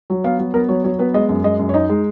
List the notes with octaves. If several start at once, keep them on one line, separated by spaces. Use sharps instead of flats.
F#3
B3 F5
F#3
B3 A#4
F#3 C#5
F#3 C#5
B3 B4
G#3 D#5
F#2
G#3 D#5
F#2
C#5
D#4 D#5
G#3